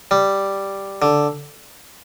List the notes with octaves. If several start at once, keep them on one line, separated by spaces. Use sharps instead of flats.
G3
D3